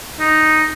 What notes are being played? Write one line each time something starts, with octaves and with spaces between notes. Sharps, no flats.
D#4